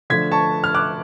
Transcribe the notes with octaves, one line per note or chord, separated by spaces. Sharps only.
D3 F3 A3 D4 G#6 B6
A5 C#6
F6
D6 F#6